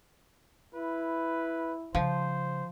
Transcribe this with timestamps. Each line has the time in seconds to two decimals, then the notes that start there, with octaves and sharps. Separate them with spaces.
0.75 E4 B4
1.95 C#3 F3 C5